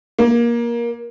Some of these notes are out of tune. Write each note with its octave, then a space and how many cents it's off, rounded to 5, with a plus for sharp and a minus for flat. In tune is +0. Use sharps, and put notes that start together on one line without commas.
A#3 +20